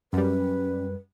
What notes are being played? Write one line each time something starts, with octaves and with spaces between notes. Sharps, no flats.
F#2 G3 C#4 B4